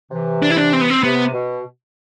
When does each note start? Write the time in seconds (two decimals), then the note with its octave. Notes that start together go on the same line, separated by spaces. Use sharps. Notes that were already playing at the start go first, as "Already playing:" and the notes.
0.11 C3 E3
0.43 D4
0.50 E4
0.57 D4
0.73 C4
0.81 B3
0.90 C4
1.03 C3 B3
1.34 B2